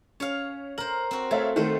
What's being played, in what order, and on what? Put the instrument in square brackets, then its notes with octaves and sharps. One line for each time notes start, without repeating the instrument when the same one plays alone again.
[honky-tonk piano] C#4 [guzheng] C#5 F5
[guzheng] A#4 C5 [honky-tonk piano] F#7
[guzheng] C4 F#4
[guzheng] A3 [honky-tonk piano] C#5 E5 F5
[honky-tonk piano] D#3 A3 [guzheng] C5 F#5